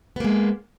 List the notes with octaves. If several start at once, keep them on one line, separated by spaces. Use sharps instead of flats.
G#3 A#3 B3